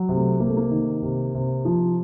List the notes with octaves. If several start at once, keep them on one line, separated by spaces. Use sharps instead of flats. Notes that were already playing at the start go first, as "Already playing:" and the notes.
Already playing: F#3
C3
A3
C3 A#3
A3
A#3
D#3
C3
C3
F3